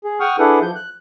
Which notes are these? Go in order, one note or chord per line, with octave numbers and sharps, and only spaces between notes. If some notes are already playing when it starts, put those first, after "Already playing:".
G#4
F#5 G5 C#6 D#6 F6
D4 E4 G#4 A4 B4 F#5
F3 G6
F#6